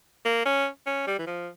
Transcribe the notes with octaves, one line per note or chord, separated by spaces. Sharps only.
A#3
C#4
C#4
G3
E3
F3